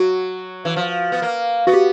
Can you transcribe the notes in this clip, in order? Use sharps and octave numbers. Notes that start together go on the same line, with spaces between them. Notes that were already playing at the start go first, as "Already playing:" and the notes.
Already playing: F#3 F#4
E3
F3
B3
A#3
B3 F#4
G4